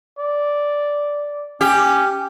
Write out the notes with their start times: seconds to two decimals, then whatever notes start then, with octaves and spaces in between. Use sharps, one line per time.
0.19 D5
1.61 C#4 G4